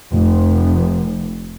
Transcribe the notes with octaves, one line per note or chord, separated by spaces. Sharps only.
F1